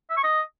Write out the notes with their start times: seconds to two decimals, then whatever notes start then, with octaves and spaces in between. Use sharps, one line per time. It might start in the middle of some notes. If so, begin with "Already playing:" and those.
0.10 E5
0.17 C#6
0.24 D#5